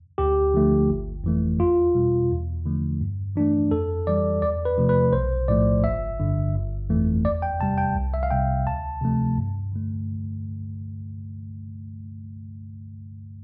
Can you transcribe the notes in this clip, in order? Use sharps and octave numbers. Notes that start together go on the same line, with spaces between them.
D2 G4
D3 F3 A3
G1
F2 E3 A3
E2 F4
B2 G3
E2
D3 F3 A3
G2
E3 A3 D4
F2 A4
E3 G3 D5
E2 D5
B4
C3 F3 A3
B4
B1 C5
A2 F3 A3 D5
G1 E5
G2 D3
G1
F2 E3 A3
E2 D5
G5
C3 G3 A5
G5
C2
E5
F5
C3 G3 G5
D2 A5
C3 F3 A3
G2
D3 A3